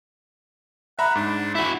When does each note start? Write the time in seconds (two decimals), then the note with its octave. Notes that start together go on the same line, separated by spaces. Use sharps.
0.99 E5 F#5 A#5 B5
1.15 G#2 D4
1.55 E4 F#4 B5